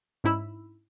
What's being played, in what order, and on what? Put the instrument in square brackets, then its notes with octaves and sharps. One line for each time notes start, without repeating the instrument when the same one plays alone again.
[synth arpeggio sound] G#2 C#4 D#4 E4 B5 E6